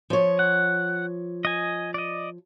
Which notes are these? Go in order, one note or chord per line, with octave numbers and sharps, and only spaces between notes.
F3 C#5
F#5
D#5 G#5
D5 D#5